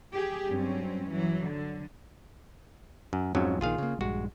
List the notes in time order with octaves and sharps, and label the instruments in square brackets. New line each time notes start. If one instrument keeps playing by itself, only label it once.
[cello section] G4 G#4
G2 F#3 C4 C#4
E3 F#3
D3
[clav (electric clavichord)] F#2
[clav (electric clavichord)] F2 G#2 F#3 [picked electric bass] F3 C#4
[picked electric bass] A#1 A#2 D#3 [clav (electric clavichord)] F4 G#4 F5
[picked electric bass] C#3 A#3
[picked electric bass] A#1 G2 G#3 [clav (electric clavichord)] F#4